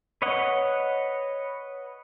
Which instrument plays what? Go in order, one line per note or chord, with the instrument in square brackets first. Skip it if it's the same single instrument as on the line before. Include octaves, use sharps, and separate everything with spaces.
[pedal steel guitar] B4 C#5 D#5 F#5